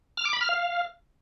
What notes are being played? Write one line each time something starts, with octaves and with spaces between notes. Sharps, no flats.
F6
D6
B5
F6
F5